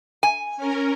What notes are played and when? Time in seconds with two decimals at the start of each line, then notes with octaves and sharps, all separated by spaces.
0.23 G#5
0.57 C#4 A#4